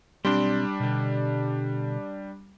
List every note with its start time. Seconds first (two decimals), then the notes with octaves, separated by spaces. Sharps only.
0.25 B1 G3 C4 D4 C6
0.80 B2 D3